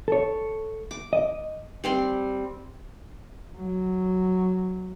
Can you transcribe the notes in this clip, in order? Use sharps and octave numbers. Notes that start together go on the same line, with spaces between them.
A4 C#5
D6
D#5
G3 C4 C6
F#3